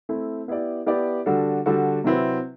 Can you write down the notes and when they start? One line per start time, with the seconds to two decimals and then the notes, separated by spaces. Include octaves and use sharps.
0.09 A3 C4 E4
0.48 B3 E4 G4 D5
0.86 B3 E4 G4 D5
1.26 D3 G3 D4 F#4 A4
1.66 D3 G3 D4 F#4 A4
2.04 C3 F#3 C4 E4 B4